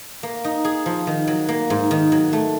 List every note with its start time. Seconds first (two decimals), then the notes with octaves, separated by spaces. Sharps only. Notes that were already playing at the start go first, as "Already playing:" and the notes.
0.23 A#3
0.44 D#4
0.65 G#4
0.86 F3
1.07 D#3
1.28 F#3
1.48 A#3
1.70 G#2
1.91 D#3
2.12 F#3
2.33 A3